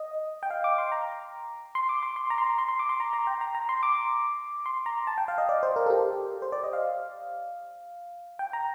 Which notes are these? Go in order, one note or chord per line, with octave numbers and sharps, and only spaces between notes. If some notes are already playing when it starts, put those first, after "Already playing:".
Already playing: D#5
G5
F5
D6
C6
A#5
C6
D6
C6
C6
A#5
C6
A#5
C6
C6
D6
C6
A#5
A#5
G5
A#5
A#5
C6
D6
C6
A#5
A5
G5
F5
D#5
D5
C5
A#4
A4
G4
C5
D5
D#5
F5
G5
A#5